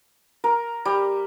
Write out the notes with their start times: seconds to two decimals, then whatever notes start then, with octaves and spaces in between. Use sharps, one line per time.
0.44 A#4
0.85 G3